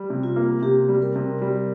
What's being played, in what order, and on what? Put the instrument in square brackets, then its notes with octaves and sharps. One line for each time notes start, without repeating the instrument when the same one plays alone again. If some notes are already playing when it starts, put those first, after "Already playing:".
Already playing: [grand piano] G3
C3
[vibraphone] F4
[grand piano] A#3
[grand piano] C3 [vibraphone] G4
[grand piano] G3
[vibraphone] A#4
[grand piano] C3
G3